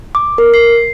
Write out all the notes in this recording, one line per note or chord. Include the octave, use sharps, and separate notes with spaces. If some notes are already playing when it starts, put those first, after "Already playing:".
D6
A#4
C7